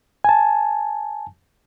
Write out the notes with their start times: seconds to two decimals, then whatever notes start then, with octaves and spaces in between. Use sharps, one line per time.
0.24 G#5 A5